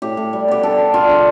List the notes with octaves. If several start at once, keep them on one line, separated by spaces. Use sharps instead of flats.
A2 G4
A2
G3
B3 G4
D4 A4
G3
D3 F4
D3